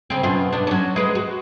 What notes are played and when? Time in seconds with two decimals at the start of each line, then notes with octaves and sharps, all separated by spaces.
0.10 C#3 C4
0.23 F#2 B2 F4
0.53 B3 D4
0.67 F#3 C#4
0.96 G#3 B4
1.15 F#4